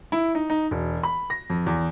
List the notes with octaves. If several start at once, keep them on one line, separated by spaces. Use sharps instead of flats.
E4
D#4
D#4
E1
B5
A#6
F2
E2